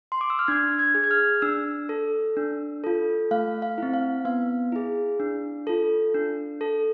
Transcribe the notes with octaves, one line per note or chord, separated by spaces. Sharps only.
C6
D6
E6
F6
D4 G#6
G#6
G#4
G#6
F6
D4 E6
A4
D4
F4 A4
A3 F5
F5
C4 E4
F5
B3 F5
E4 G#4
D4
F4 A4
D4
A4